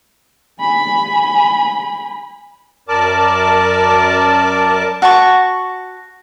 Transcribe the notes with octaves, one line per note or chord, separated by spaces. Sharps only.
G#5 B5
F#2 A#4 D5 A5 D6
F#4 A5 C#6